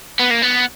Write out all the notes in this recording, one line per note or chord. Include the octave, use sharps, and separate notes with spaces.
B3
A#3
B3